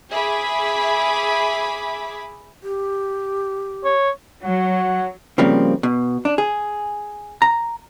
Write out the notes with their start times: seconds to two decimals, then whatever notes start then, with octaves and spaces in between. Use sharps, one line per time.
0.11 G#4 E5 B5 D6 B6
2.63 G4
3.85 C#5
4.43 F#3 F#4 C#5 F#5
5.38 C#3 F3 G3 A#3 C4
5.83 B2
6.25 D4
6.38 G#4
7.42 A#5